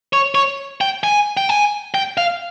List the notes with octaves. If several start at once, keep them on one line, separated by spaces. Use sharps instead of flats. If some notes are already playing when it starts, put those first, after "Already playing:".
C#5
C#5
G5
G#5
G5
G#5
G5
F5